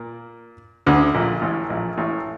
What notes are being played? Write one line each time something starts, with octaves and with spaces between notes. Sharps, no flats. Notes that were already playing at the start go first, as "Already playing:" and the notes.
Already playing: A#2 A#3
D2 D3
A#1 A#2
A1 A2
A#1 A#2
A1 A2